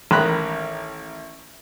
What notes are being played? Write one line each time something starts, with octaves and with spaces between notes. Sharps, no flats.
A1 D#3 A#5 B5 F#6